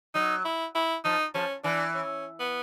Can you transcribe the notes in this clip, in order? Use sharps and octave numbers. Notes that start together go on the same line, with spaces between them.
F#3 D#4
E4
E4
F3 D#4
F3 C#4
E3 D4
C#4
B3